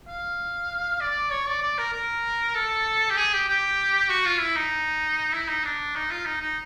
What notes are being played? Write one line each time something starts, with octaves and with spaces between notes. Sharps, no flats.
F5
D5
C#5
D5
D5
A#4
A#4
A4
G4
G#4
G4
G4
F#4
F4
E4
D#4
E4
D#4
D4
D#4
F4
D#4
D#4